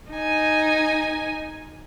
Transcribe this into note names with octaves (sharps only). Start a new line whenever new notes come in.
D#4 G#5